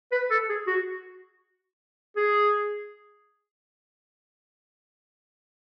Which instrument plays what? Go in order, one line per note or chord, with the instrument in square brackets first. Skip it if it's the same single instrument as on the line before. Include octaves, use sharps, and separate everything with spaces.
[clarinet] B4
A4
G#4
F#4
G#4